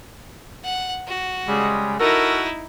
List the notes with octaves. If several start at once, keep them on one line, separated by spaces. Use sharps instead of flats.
F#5
F#4
C#3 G3 G#3
D#4 E4 F#4 A4 A#4